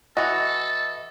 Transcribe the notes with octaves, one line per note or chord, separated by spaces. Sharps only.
E3 F#4 A4 D#5